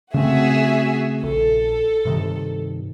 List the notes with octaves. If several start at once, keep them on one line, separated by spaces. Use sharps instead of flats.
C#3 A3 C4 F#4 G#4 E5
A#1 A4
G2 C3 D#3